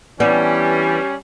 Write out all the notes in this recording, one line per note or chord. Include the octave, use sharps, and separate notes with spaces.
E3 G3 B3 C#4 D4